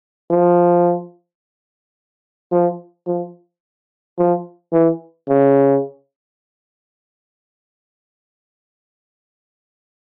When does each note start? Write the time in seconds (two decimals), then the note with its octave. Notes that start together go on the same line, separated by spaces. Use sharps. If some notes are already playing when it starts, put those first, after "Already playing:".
0.30 F3
2.52 F3
3.07 F3
4.18 F3
4.73 E3
5.28 C#3